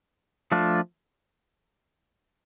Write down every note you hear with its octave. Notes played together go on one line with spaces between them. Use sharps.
F3 A3 D4 F4